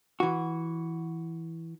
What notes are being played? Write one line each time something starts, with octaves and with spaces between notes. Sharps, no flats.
E3 F#4